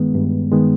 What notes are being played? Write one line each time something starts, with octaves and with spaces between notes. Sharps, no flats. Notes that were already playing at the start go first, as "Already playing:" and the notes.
Already playing: G2 D#3 G#3 B3
G2
D#3 G#3 B3